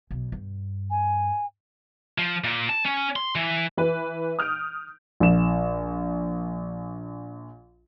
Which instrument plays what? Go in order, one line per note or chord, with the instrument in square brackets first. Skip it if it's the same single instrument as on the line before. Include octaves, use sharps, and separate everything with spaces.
[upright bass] B1
G2
[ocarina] G#5
[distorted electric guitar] F3
A#2
A5
C#4
C6
E3
[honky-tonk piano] E3 B4
D#6 F6 G6 D7
[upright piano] A#1 E7